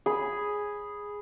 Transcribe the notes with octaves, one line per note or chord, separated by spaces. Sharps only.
G#4 B5